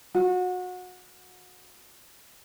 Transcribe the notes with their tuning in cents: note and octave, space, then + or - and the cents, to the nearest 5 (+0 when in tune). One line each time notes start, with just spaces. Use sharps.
F#4 -25